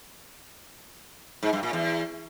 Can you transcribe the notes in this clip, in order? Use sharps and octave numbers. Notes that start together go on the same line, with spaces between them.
G#2
G2
A#2
E2